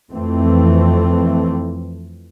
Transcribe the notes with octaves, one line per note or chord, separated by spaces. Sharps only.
F2 E3 A3 C4